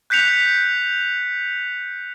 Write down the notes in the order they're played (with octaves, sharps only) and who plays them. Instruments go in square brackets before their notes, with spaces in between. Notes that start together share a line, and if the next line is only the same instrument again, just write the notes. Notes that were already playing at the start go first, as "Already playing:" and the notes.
[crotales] F#6 G6 B6 C#7 F7